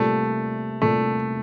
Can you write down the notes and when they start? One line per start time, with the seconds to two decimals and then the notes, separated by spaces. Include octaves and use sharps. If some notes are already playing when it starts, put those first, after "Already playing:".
Already playing: C3 G3 A3 A#3 F4
0.82 C3 G3 A3 A#3 F4